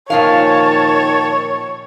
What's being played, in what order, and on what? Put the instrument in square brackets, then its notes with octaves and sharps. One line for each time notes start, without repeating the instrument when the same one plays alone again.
[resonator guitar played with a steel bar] A#2 F3 F5 [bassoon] D#3 [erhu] C#5 [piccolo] A5